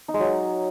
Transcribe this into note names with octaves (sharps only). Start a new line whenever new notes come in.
D#4
G#3
F#3